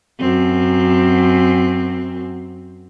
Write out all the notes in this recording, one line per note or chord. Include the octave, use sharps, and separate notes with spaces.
F#2 C4